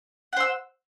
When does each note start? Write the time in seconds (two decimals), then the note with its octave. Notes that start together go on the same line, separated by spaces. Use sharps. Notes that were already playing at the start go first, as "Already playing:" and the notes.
0.33 F#5
0.36 C5
0.40 E6